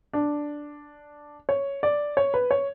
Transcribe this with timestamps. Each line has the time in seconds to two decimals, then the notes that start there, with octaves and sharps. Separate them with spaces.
0.13 D4
1.49 C#5
1.83 D5
2.17 C#5
2.34 B4
2.51 C#5